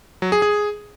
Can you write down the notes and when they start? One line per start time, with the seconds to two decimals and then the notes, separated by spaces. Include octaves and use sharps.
0.22 F#3
0.32 G#4
0.42 G#4